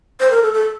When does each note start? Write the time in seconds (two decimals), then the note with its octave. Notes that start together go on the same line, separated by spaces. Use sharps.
0.20 C5
0.31 A#4
0.42 A4
0.54 A4